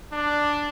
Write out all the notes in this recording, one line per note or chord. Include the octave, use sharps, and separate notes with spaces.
D4